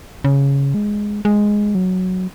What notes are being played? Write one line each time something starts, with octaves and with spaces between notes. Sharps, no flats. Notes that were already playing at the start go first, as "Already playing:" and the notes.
C#3
G#3
G#3
F#3